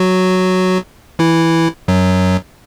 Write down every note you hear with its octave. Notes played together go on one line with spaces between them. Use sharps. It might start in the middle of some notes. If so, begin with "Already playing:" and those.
Already playing: F#3 F#4
E3 E4
F#2 F#3